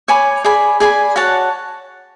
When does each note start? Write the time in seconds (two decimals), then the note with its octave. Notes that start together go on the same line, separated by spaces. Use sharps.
0.08 C#5 G#5 B5 D6
0.44 G#4 D5 G#5 B5
0.80 G#4 D5 G#5 B5
1.16 F#4 C#5 F#5 A5